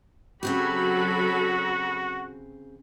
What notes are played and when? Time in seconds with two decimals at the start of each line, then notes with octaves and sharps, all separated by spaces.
0.43 C#3 F#3 C4 F#4 G4 A4 B5